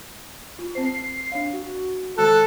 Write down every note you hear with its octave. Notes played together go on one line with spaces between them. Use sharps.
F4
C4 C5 C7
D4 C#5 F5
F#4
D#3 G#3 A4 A5 F#6